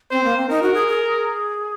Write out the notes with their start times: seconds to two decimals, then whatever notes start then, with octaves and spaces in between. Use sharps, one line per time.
0.11 C4 C5
0.24 A#3
0.37 C4
0.49 D#4 A#4
0.63 F#4
0.74 G#4
0.88 G#4